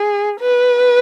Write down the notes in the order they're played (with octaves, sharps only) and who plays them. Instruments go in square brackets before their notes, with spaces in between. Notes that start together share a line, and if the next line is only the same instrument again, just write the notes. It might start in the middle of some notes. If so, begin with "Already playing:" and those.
Already playing: [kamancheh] G#4
B4